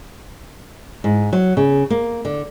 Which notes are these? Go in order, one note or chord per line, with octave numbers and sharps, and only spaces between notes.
G#2
F#3
C#3
A#3
D3